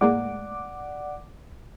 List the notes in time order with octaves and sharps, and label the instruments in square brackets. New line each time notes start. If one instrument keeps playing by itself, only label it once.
[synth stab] A2 G#3 A#3 [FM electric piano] D5 F#5 D6